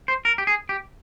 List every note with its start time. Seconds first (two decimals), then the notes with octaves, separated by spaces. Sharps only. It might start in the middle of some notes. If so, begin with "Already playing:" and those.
0.08 C5
0.25 A#4
0.38 G4
0.47 G#4
0.69 G4